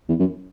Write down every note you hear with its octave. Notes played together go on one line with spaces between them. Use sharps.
E2
F#2